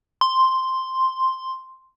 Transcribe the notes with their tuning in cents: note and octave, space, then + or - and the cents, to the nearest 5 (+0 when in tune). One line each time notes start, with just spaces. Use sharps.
C6 +0